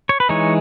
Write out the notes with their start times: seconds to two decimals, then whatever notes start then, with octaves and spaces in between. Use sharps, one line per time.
0.09 C#5
0.20 B4
0.29 E3 G#3 D#4 C#5